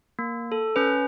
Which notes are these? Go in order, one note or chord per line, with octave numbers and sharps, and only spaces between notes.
A#3
A4
C#4 B4